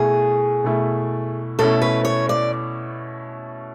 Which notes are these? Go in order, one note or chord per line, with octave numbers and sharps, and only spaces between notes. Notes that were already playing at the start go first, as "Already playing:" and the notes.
Already playing: B2 A3 E4 G#4
B2 A3 E4
B2 A3 C#4 E4 A4
B4
C#5
D5